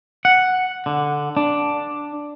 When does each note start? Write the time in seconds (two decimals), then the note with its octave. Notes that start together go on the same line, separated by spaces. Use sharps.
0.25 F#5
0.86 D3
1.37 D4